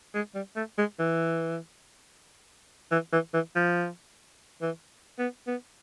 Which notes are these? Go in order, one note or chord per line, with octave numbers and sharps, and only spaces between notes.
G#3
G3
A3
G#3
E3
E3
E3
E3
F3
E3
B3
B3